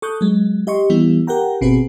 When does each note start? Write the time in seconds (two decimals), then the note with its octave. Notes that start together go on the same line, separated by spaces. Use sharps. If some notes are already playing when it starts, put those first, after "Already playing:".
0.02 A4 C#6 D#6 F#6 G6
0.21 F#3 G#3
0.67 G4 D#5 C6 C#6
0.90 E3 G3 B3 E4
1.27 G4 A#4 F#5 G5 A#5
1.61 G1 B2 C4 F#4 G#4 B4